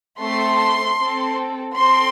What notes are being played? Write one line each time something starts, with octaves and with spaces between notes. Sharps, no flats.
A3 C4 A4 C6
C4 A4
C4 A4 C6